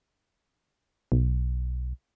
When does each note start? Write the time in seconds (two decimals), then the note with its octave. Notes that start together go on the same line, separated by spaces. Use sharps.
1.12 B1